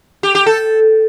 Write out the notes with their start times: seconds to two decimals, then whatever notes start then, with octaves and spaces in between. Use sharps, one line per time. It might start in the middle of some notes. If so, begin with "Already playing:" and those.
0.23 G4
0.35 G4
0.46 A4